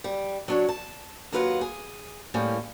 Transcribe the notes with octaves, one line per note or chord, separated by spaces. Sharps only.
G3
F#3 D4 C#5
A5
D#2 F#3 F4 B4 E5 F#5
G#4
A2 G3 A#3 C#4